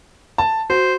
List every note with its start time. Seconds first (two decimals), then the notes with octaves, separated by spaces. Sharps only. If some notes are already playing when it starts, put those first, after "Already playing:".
0.38 A5
0.70 F#4 C5